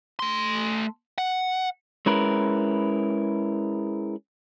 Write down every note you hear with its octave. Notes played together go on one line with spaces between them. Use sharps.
A3 C6
F#5
G#3 C#4 E4 A#4 B4